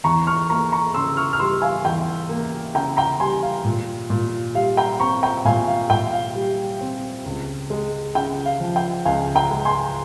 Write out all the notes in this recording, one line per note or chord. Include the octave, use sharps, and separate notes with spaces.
E2 A#5 C#6
C#6 F6
A#3 A#5 C#6
A#5 C#6
C#3 C6 E6
C#6 F6
F6
G3 C6 E6
F5 G#5
E2 G5
A#3
C#3 G5 A#5
G5 A#5
G3 G#5 C6
F5
A#2
A#2
G3 F5
G5 A#5
C4 A#5 C#6
G5 A#5
A#2 F5 G#5
F5
A#2 G5
F5
G3
C4
C#2
G#3
C#3 G5
F5
F3
G5
C#2 F5 G#5
G5 A#5
G#3
G#5 C6